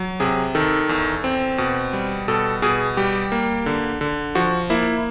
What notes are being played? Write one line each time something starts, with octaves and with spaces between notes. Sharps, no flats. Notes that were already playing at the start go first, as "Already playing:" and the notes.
Already playing: F#3
C3 G#4
D#3 A4
E2
C4
B2
G3
B2 A4
B2 G#4
G3 G4
A#3
D3
D3
F3 F#4
A#3 E4